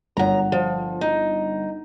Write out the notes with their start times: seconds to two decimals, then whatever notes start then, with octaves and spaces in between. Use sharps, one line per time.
0.17 G1 F#2 F#5 A#5
0.52 F3
1.01 D#4